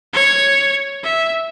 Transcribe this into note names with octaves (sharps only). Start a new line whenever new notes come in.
C#5
E5